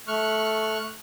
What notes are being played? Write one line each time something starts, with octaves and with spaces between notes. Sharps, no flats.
A3 C#6 F6 F#6